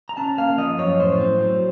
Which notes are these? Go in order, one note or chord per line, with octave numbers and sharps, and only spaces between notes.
A#5
C#4 A5
A#3 F5
F3 D#5
F#2 C#5
A2 C5
C4
F#3